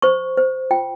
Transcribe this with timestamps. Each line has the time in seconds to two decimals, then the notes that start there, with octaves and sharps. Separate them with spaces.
0.02 C5 C#6
0.37 C5
0.71 F4 G5